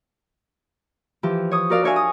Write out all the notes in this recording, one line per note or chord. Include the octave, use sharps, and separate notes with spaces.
E3 F3 G4
C#5 D#6
F#4 A#4 D5 F5
D4 A#4 C#5 E5 F5 G#5
D#6